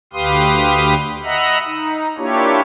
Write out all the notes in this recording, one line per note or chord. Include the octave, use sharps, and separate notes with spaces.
D2 G4 B4 F5 C6 D#6
D#5 E5 F#5 A#5 B5
D#4
A#3 D4 E4 F4 G4 C#5